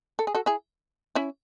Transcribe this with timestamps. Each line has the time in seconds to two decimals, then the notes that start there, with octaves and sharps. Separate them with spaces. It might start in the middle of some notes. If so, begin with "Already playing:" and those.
0.19 A4
0.27 G#4
0.35 F#4 A4
0.46 E4 G#4
1.15 C#4 E4